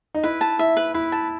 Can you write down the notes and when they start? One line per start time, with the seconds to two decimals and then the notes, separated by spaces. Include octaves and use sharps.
0.15 D#4
0.23 E4 B4
0.41 A5
0.59 E4 E5
0.77 B4
0.94 E4 B4
1.12 A5